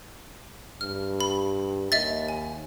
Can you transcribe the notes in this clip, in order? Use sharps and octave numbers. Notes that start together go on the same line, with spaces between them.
G2 F6
B5
D#2 D#5 E5 A6
G#5